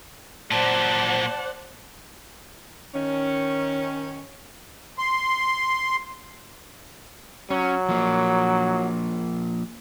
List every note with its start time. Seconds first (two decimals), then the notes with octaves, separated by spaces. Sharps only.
0.51 A#2 F#3 C5 D5 F#5 A5
2.94 D#3 C#4
4.98 C6
7.50 F#3 C#4
7.89 F3 A#3